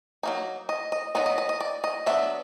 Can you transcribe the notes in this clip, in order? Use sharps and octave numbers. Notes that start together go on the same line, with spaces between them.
F#3 A#3 D#4
D#5
D#5
F#3 B3 D#4 D#5
D#5
D#5
D#5
D5
D#5
F#3 B3 D4 E5